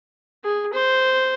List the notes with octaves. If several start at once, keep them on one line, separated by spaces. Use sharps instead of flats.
G#4
C5